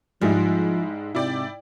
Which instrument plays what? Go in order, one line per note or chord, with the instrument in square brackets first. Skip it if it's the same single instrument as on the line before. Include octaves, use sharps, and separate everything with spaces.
[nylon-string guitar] G#2 [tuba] F3 [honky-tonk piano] G3 G#3 E4
[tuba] C3 [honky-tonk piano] E4 D5 G5